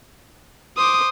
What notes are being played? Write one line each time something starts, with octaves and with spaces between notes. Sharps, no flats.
C5 D6 D#6